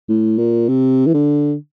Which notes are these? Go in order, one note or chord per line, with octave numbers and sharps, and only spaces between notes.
A2
A#2
C3
E3
D3